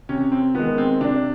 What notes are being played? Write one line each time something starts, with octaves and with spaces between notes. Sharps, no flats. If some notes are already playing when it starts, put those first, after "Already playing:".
C3 C#4
C4
D#3 G#3 B3
C4
C3 D4